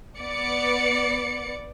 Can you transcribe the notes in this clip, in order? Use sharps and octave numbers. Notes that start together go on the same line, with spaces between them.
B3 D5 C#7